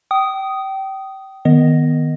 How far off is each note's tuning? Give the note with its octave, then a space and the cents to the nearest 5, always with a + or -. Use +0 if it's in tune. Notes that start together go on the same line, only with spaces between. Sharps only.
G5 -25 D#6 +0
D#3 -5 B3 +0 D#5 +0